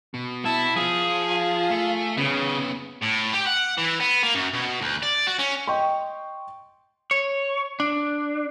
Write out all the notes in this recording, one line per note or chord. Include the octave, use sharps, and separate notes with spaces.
B2
E4 A5
F3 F4 G#4
A3
C#3 B3 C#4
A2
G4
F#5
E3
B3
A#3
F#2
B2
D2
D5
F#4
C#4
D#5 G5 C6 C#6
C#5
D4